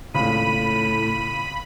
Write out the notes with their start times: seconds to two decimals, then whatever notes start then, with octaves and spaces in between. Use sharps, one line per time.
0.14 G#1 C#2 A2 C#3 B5 D#7